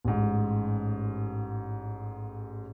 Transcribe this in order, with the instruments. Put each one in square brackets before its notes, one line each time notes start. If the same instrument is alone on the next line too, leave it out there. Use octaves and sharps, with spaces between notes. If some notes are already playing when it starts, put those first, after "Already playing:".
[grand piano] A1 G#2